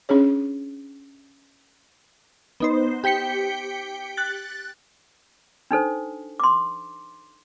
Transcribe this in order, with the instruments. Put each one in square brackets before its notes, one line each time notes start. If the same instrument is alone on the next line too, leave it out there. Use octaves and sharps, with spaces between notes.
[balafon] C#4 D4 G#4 C#5
[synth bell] B3 D#4 C5
G4 G5 B6 C#7 G7
F#6 A6
[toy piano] D4 D#4 A4 C5
C6 D6